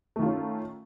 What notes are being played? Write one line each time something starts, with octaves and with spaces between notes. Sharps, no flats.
D#3 A3 C#4 F4